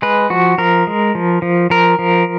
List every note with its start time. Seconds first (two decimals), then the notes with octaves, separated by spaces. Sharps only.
0.02 G#3 B4
0.30 F3 F#4
0.58 F3 A#4
0.87 G#3
1.15 F3
1.42 F3
1.70 F3 A#4
1.99 F3